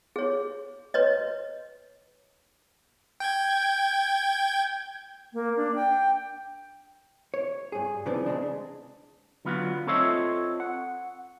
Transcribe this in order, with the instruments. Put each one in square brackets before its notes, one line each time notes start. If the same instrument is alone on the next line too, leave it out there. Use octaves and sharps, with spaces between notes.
[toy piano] G#4 C#5
B4 C#5 D#5
[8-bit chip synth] G5 G6 G#6
[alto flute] A#3
D4
G5
[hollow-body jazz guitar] C#5
G2 G#4
C#3 E3 F3 B3 C4 D4
C#3 G#3 D4
[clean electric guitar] D3 F#3 B3 F4 F#4
C4 F4 A4 C#5 D#5 E5
F#5